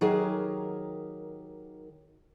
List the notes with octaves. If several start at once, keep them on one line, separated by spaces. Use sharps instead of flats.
D#3 F#3 G4 G#4 A#4